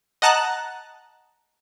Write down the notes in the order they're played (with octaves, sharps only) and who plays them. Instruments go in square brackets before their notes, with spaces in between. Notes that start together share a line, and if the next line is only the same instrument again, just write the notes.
[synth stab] D#5 F#5 A5 A#5 F#6